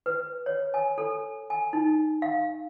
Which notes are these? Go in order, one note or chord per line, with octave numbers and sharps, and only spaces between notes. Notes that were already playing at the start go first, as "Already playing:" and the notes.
B4
C#5
G#5
A4
G#5
D#4
F5